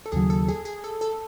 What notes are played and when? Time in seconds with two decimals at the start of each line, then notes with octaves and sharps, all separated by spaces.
0.06 A4
0.12 D#2 C#3 F#3 G#4
0.30 A4
0.48 G#4
0.65 G#4
0.84 A4
1.01 A4